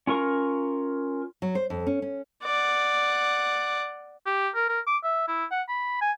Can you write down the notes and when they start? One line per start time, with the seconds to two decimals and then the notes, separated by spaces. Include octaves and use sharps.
0.07 C#4 F4 A#4 C#6
1.42 F#3
1.55 C5
1.70 F2
1.87 C#4
2.02 C#4
2.43 D5 F#5
4.26 G4
4.55 A#4
4.69 A#4
4.87 D6
5.04 E5
5.28 E4
5.51 F#5
5.68 B5
6.01 G#5